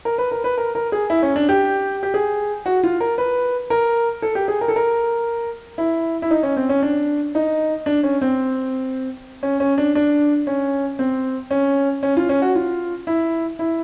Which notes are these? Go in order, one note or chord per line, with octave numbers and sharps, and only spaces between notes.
A#4
B4
A#4
B4
A#4
A#4
G#4
E4
C#4
D4
G4
G4
G#4
F#4
F4
A#4
B4
A#4
A4
G4
G#4
A#4
A4
A#4
E4
E4
D#4
C#4
C4
C#4
D4
D#4
D4
C#4
C4
C#4
C#4
D4
D4
C#4
C4
C#4
C#4
F4
C#4
F#4
F4
E4
E4